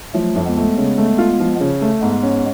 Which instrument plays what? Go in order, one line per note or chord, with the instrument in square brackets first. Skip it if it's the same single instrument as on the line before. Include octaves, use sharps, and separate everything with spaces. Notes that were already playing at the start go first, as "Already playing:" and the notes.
[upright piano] F3 [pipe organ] F#3 A3
[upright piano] F2
[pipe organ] G#3 B3
[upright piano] A3
C#3
A3
F4
F3
C#3
A3
[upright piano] G#2 [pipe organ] G#3 B3
[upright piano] C#4